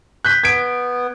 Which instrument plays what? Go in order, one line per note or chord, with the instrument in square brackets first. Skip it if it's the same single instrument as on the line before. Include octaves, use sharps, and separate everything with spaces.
[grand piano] F#6 G6 B6
[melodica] B3 [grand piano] G#6 B6 D7